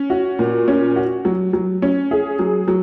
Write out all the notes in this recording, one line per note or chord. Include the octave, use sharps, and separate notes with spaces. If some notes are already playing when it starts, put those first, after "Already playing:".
Already playing: C#4
F#4
A#2
C#4
F#4
F#3
F#3
C#4
G#4
F#3
F#3